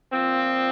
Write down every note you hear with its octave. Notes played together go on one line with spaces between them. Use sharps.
A#2 F3 C4